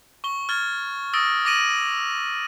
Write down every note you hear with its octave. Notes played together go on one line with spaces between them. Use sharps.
C#6 G7
F6 G#6 A6 G7
D#6 E6 A6 A#6 D7 G7
D6 A6 A#6 D7 D#7 F#7